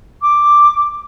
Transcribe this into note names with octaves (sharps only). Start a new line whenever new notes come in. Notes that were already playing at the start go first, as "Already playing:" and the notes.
D6